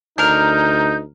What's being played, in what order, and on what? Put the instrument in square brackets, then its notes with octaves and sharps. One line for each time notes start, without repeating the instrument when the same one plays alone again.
[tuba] D2 [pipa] D4 A#4 [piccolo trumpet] D#4 [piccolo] G6